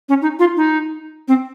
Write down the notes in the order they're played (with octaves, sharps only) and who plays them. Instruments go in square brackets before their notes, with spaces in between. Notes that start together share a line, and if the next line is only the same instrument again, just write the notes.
[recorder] C#4
D#4
F4
D#4
C4